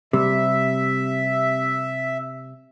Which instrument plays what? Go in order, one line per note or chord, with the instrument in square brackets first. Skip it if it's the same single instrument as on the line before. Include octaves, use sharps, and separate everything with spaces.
[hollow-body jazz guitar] C3 G3 [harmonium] E5